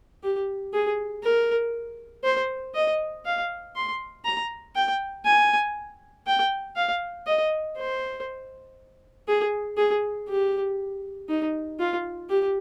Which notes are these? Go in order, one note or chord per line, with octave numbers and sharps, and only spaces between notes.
G4
G#4
A#4
C5
D#5
F5
C6
A#5
G5
G#5
G5
F5
D#5
C5
G#4
G#4
G4
D#4
F4
G4